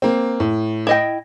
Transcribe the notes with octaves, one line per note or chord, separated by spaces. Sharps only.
A#3 C4
A2
E4 D#5 G5